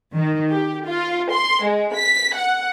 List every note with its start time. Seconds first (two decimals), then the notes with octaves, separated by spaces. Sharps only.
0.13 D#3
0.50 G4
0.86 F4
1.31 C6
1.62 G#3
1.94 B6
2.36 F#5